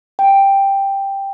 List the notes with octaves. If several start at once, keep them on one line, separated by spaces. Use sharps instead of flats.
G5